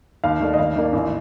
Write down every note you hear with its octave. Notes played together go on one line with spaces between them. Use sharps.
D#2 F5
D#3 A3 D4
D#5
D#2 F5
D#3 A#3 D4
A1